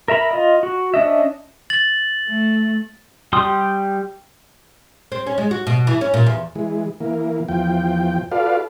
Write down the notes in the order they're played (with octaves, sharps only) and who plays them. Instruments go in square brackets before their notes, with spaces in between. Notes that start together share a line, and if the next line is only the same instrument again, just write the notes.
[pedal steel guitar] A#4 E5 A#5 B5
F4 D#5
F#4
C#4 D4 D#5 E5
[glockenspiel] A6 F#7
[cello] A3
[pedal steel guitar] G3 G4 C6 D#6
[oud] C4
C#4
G#3
F#4
B2
E3
C#4
A#2
E2
[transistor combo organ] E3 G#3
E3 A#3
E2 F3 G5
F4 F#4 A4 B4 D5 F5